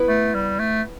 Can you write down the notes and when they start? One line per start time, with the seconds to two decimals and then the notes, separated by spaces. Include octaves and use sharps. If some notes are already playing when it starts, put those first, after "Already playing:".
Already playing: B3 E4 B4
0.09 A3
0.34 G3
0.60 A3